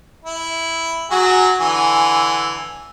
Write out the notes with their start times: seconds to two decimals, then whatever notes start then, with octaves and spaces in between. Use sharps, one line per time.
0.25 E4
1.11 F#3 F#4 G#4
1.61 D3 E3 G#5